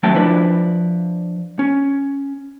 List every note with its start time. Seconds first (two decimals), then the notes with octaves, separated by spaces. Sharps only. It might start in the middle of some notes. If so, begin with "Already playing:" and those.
0.03 D#2 F#3 A3 C#4 G5 A5
0.15 F3 D4 E4 B4
1.59 C#4